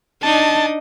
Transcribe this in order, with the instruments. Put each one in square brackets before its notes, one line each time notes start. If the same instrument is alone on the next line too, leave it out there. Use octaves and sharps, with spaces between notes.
[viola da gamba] D4 D#4 D#5 [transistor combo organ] A5